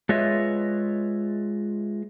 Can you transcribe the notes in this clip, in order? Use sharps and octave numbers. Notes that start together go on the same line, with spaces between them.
G#3 F4 B4 C#5 D#5 E5